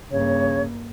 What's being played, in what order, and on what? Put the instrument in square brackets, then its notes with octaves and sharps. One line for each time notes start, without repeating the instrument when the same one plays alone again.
[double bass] G2 A#3 [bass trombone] C#3 [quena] C#5